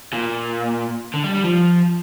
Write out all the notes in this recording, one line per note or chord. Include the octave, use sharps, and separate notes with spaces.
A#2
D3
G3
G3
F3